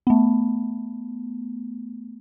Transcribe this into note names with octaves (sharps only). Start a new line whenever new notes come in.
A3 B3